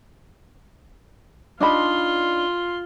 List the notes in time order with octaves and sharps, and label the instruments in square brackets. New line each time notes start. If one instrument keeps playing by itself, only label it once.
[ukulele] D4 D#4 B5 [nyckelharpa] F4 C6